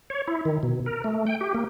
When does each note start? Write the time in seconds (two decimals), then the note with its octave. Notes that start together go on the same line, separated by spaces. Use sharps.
0.10 C#5
0.27 E4
0.45 D#3
0.63 B2
0.86 A#4
1.04 A3
1.27 G5
1.41 G4
1.54 A#3